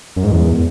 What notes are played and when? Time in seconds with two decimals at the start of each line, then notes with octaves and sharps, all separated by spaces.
0.16 F#2
0.24 G#2
0.31 E2